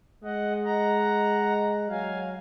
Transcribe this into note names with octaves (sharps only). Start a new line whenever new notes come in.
G#3 D#5 F#5
F#5 A#5
F#3 F5 G#5